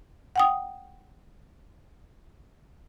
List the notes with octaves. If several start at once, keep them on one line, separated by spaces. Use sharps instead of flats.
F#5 G5 D#6